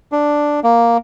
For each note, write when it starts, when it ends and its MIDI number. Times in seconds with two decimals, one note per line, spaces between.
0.12 0.60 62
0.64 0.97 58